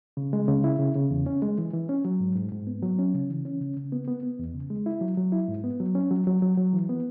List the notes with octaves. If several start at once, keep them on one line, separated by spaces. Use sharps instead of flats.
C#3
G#3
C#3
E4
C#3
C#3
E2
C#4
G#3
E3
E3
C#4
F#3
G#2
G#2
G#2
B3
F#3
C#4
C#3
E3
C#4
C#3
C#3
B3
B3
B3
E2
C#3
G#3
E4
F#3
F#3
E4
G#2
B3
F#3
C#4
F#3
F#3
F#3
F#3
E3
B3